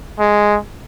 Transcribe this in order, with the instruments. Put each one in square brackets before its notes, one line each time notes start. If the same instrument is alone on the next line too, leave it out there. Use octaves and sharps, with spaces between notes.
[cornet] G#3